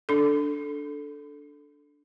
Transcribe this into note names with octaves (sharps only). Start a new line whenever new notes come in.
D4 A4